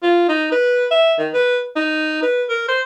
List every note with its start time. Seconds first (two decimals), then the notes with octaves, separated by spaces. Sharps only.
0.03 F4
0.29 D#4
0.52 B4
0.91 E5
1.19 D#3
1.34 B4
1.76 D#4
2.23 B4
2.49 A#4
2.68 C5